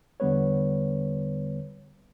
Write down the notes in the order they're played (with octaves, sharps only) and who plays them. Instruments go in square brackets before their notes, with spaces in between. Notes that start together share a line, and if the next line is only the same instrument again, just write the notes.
[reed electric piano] E2 D3 G3 B3 B4 C#5